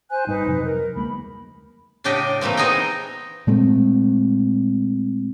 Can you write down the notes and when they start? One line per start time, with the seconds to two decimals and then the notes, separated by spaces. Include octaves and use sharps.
0.10 C5 G#5 F#6
0.27 G1 G2 D#4 B4
0.46 F2 C3 F#3
0.64 A#4
0.96 D2 G#3 A#3 B5
2.04 A2 C#3 D4 G4 D#5 G5
2.41 A#2 E3 A3 A#3 C4
2.57 B3 C4 D#4 G#4 D#5 G5
3.47 A#2 G#3 A3 C4